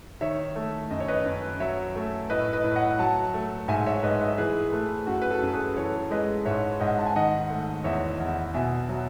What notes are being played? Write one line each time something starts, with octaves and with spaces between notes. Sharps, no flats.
D#3 C#5 E5
A3
F#2 D#5
C#5
B4 D#5
F#2
F#3 C#5 E5
A3
A2 B4 D#5
B4 D#5
A2
D#5 F#5
F#3 F#5 A5
A3
G#2 E5 G#5
C#5 E5
G#2 B4 D#5
B4 D#5
E3 G#4 B4
A3
F#2 F#4
B4
F#4 A4
F#2
G#4 B4
E3 A4 C#5
G#3 B4 D#5
G#2 C#5 E5
G#2 D#5 F#5
A5
G#5
D#3 D#5 F#5
A3
E2 C#5 E5
E2
B2 E5 G#5
F#3